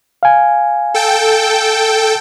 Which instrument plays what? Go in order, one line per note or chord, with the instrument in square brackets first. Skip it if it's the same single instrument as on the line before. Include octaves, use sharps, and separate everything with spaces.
[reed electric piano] F5 G#5
[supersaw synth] A4 G5